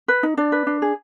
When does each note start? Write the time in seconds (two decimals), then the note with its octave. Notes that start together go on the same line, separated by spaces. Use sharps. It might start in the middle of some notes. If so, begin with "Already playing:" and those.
0.08 B4
0.23 D#4
0.37 D4 D5
0.52 B4
0.67 D4
0.82 G#4